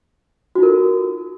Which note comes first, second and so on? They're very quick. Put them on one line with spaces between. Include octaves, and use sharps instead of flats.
F#4 D#4 F4 A#4 A4